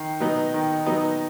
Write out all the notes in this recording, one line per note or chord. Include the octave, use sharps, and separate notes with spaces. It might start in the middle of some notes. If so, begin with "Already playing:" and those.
Already playing: D#3 C7
F#3 B3 D#4
D#3
F#3 B3 D#4